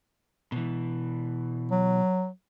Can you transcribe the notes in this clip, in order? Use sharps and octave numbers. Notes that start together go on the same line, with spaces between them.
B2 E3
F#3